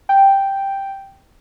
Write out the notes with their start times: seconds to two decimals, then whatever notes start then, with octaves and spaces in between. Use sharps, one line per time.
0.09 G5